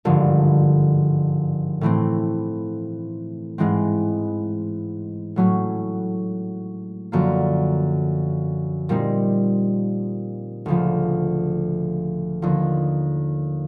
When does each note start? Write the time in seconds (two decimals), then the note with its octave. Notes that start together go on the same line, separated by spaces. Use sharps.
0.05 G#1 G2 D3 F3
1.81 A2 E3 A3 C4
3.58 G#2 E3 G#3 C4
5.36 A2 F#3 A3 C#4
7.12 F#2 D3 F3 A#3
8.89 A#2 G3 C4 D#4
10.66 D2 C#3 F3
12.42 D#2 D3 F3